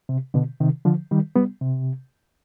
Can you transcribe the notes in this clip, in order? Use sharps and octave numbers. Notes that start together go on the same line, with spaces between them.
C3
B2 D3
C3 D#3
D3 F3
D#3 G3
G3 B3
C3